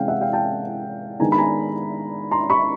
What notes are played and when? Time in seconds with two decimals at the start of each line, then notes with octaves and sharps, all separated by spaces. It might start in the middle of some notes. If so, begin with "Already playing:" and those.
Already playing: C3 E3 G#3 C#4 F5 G5
0.08 E5 F#5
0.21 F5 G5
0.33 G5 A5
1.19 D#3 G#3 B3 D4 G#5 A#5
1.32 B5
1.38 G#5 A#5
2.31 A#5 C6
2.50 B5 C#6